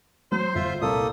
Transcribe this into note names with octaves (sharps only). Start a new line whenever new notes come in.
F#3 C5
G1 F4 E5
C2 A#2 A#3 A4 D#6